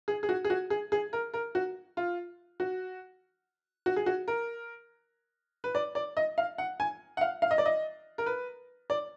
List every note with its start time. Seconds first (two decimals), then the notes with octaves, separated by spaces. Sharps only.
0.08 G#4
0.23 G#4
0.29 F#4
0.45 G#4
0.50 F#4
0.70 G#4
0.92 G#4
1.13 A#4
1.34 A#4
1.55 F#4
1.97 F4
2.60 F#4
3.86 F#4
3.96 G#4
4.06 F#4
4.28 A#4
5.64 B4
5.75 D5
5.95 D5
6.17 D#5
6.38 F5
6.58 F#5
6.80 G#5
7.17 F#5
7.21 F5
7.42 F5
7.51 D#5
7.58 D5
7.66 D#5
8.18 A#4
8.26 B4
8.90 D5